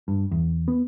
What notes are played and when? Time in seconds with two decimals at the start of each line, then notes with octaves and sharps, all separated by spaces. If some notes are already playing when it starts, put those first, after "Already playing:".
0.08 G2
0.31 E2
0.68 B3